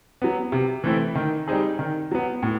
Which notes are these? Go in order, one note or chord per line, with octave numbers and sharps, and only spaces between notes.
F#3 B3
C3
E3 A3 C4 E4
D#3
G3 C4 D#4 G#4
D#3
F#3 B3
A2